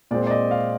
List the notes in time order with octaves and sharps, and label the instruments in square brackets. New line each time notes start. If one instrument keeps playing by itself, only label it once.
[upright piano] A#2 G#3 C4 D5
D5
D#5
F5